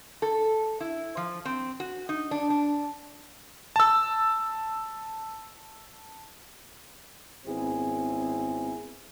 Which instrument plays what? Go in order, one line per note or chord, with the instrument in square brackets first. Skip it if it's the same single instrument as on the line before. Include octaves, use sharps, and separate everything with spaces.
[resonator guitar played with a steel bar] A4
E4
F3
C4
F#4
D#4
D4
D4
[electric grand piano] A5 E6
[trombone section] G#1 B3 C4 E4 G#4